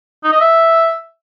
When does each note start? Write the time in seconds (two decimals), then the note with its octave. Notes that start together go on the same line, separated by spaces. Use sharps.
0.24 D#4
0.32 D#5
0.41 E5